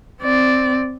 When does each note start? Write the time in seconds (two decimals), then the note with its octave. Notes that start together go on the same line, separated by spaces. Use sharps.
0.22 C4 D5